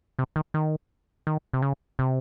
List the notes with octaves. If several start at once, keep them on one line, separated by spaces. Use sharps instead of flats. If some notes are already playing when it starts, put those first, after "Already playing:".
C3
D#3
D#3
D#3
C3
C#3
C3